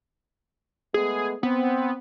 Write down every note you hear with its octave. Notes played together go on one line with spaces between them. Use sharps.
G#3 A3 B3 G#4
B3 C4